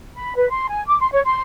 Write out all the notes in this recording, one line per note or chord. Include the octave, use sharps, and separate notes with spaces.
B5
B4
C6
G#5
D6
C6
C#5
C6